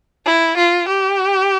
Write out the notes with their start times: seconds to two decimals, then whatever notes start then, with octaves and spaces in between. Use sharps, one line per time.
0.25 E4
0.57 F4
0.88 G4